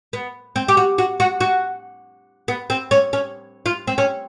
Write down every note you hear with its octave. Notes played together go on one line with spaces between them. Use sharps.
B3
C4
G4
F#4
F#4
F#4
F#4
B3
C4
C#4
C#4
F4
C4
C#4